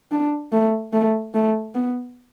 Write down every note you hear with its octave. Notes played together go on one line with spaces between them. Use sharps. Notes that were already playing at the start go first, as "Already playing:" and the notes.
D4
A3
A3
A3
B3